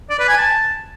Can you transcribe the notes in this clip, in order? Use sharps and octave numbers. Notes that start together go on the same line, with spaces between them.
D5
B4
G#5
A5